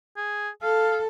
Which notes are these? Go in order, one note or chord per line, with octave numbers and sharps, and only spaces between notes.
G#4
A4 F5